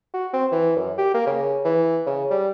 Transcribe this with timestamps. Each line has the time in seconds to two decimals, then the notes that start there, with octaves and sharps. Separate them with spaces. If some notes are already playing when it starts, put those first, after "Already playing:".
0.14 F#4
0.33 C4
0.52 E3
0.76 F#2
0.98 G4
1.14 A#3
1.27 C#3
1.65 E3
2.06 C#3
2.30 G3